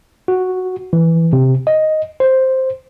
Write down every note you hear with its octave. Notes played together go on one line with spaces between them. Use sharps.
F#4
E3
C3
D#5
C5